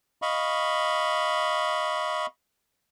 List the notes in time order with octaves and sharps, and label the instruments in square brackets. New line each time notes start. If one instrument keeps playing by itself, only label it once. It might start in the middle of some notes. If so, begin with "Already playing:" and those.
[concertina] D#5 F5 B5 C#6